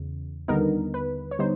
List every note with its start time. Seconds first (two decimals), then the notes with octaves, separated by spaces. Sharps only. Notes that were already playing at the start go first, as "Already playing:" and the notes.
Already playing: E2 C#3
0.48 D#2 D3 G3 B3 D#4 A#4
0.94 B4
1.31 C#5
1.39 D3 G3 B3 D#4 C5